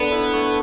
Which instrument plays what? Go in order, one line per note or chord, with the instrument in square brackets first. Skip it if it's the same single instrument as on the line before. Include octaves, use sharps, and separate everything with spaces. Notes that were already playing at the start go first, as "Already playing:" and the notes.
Already playing: [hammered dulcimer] D3 [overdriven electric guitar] B3
[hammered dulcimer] E4
A3